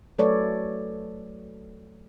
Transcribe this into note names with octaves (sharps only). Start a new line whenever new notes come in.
F#3 A3 A4 B4 C#5 D5